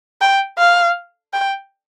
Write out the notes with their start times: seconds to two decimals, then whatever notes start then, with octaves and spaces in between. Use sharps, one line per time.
0.21 G5
0.59 F5
1.34 G5